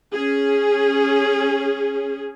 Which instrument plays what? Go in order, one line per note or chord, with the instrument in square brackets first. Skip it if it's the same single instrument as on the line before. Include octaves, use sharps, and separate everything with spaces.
[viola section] C#4 G#4